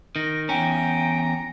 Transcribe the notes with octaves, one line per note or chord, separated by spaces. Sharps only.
D#3 A#6
E2 C#4 G5 A#5